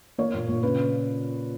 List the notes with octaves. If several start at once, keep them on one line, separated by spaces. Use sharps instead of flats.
A#3 C#5
A#2
A#2
C#3 B4